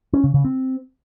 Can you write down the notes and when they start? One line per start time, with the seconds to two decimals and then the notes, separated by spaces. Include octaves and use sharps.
0.13 C#4
0.24 C#3
0.34 C#3
0.45 C4